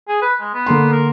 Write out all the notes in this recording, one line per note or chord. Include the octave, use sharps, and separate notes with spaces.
G#4
B4
G#3
B3
D3 A#3 C6
A#4